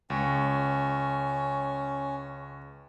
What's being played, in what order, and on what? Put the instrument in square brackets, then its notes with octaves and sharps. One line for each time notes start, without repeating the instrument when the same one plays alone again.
[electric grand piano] C#2 [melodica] C#4